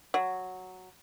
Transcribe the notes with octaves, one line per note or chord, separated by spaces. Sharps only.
F#3